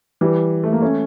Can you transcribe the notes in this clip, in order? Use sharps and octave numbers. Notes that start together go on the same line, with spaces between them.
E3 G3
A3
A#3
A3 C#4